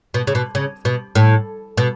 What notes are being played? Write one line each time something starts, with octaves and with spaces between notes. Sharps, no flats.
B2
C#3
B2
C#3
B2
A2
B2